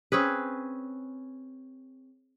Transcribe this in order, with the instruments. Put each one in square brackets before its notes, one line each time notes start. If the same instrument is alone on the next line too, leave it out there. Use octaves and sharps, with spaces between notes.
[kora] C4 C#4 G#4 B4